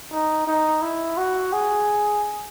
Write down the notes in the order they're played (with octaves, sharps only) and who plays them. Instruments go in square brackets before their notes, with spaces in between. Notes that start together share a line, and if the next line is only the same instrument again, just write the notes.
[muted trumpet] D#4
D#4
E4
F#4
G#4